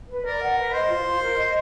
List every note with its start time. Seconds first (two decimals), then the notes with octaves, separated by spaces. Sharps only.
0.09 B4
0.25 A#4 D5
0.42 F#5
0.57 B4
0.74 C5 D#5
0.90 F4
1.06 F4
1.22 A#4
1.38 D#5